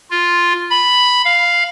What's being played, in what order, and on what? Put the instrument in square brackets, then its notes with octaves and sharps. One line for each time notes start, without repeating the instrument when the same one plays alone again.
[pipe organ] F4
B5
F5